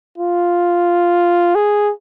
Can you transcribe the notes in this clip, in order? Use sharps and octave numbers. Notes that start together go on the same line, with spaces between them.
F4
G#4